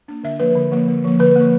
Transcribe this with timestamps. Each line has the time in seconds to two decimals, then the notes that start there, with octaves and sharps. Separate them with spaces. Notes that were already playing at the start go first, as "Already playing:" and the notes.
0.08 A#3 D4
0.23 D3 E5
0.40 F3 A#3 B4
0.55 D3
0.72 F3 A#3
0.88 D3
1.04 F3 A#3
1.20 D3 B4
1.36 F3 A#3